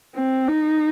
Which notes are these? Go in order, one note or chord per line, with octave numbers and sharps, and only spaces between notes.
C4
D#4